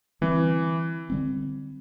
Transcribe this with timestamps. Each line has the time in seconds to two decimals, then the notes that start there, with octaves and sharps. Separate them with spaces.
0.21 D3 E3 G3 C4
1.10 D3 G3 C4